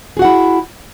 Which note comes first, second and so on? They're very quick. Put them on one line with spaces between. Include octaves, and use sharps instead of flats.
G#4 F#4 F#5 E4